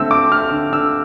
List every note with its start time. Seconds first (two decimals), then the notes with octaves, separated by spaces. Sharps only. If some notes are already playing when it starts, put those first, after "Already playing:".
Already playing: D3 A3 C4 E6
0.10 C4 D6
0.31 A3 F6
0.51 D3
0.72 D3 E6